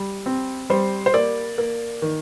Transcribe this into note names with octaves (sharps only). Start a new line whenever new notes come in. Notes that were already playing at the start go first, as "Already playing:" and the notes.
Already playing: G3
C4
G3 C5
C5
A#3 D5
A#3
D#3